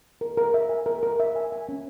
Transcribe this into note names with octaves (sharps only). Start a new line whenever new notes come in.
A#4
A#4
E5
G#5
A#4
A#4
E5
G#5
G#5
C#4